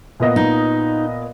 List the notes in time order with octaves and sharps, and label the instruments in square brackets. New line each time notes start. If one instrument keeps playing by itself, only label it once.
[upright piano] A#2 B3 D#5
[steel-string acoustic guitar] D#4